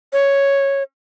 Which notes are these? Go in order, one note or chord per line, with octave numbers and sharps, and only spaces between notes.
C#5